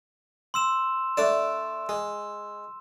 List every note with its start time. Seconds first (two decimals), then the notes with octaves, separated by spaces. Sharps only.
0.54 C6 E6 E7
1.17 A3 D4 D5 E7
1.89 G#3